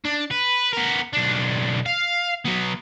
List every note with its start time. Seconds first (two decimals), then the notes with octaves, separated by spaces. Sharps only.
0.05 D4
0.31 B4
0.73 B3 A#4
1.13 B1 D4
1.86 F5
2.46 F#3 B3